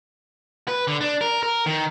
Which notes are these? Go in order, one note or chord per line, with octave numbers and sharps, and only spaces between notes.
B4
D3
D4
A#4
A#4
D#3